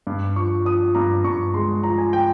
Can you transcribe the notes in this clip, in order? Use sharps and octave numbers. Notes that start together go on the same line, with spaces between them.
G2
F3 C#6
F3 D#6
G2 A#5
G2 C#6
G#3 C6
F3 A#5
G#5
G5